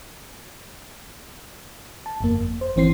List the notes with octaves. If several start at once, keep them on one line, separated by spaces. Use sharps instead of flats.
A5
G1 F2 A#3
C5
G#1 E3 C4 C5 C7